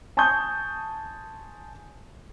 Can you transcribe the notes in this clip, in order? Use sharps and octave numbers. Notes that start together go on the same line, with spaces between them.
G#5 A5 C6 C#6 D#6 G6